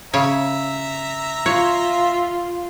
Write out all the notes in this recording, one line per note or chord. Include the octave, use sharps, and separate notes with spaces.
C#3 C#5 E5 A#5
F4 C#5